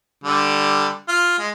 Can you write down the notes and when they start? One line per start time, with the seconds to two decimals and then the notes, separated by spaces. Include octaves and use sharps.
0.24 D3 G3
1.08 F4
1.39 G#3